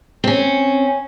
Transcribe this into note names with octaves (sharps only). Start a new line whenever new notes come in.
C4 C#4